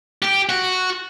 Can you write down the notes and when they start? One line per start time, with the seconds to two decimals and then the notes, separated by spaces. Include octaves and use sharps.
0.22 G4
0.49 F#4